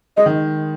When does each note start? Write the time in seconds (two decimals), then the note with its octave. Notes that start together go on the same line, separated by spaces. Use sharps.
0.17 G#3 D#5
0.26 D#3